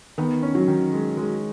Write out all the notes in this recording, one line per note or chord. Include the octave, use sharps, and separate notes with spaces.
D#3 B3
C#4
F#3
D#3
G#3
G#3